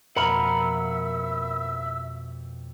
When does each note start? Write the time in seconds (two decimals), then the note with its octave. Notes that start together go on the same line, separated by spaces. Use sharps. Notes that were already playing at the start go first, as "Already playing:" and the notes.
0.16 F2 B2 A#3 A#4 E5 F#5 B5